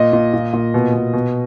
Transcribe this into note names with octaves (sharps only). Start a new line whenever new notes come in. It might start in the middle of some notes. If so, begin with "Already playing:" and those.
Already playing: A#2 D#5
A#2
A#2
A#2
B2
B2
B2